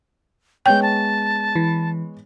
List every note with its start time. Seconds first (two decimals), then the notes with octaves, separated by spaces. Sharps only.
0.66 G#3 B3 C#5 G5 G6
0.82 A5
1.55 E3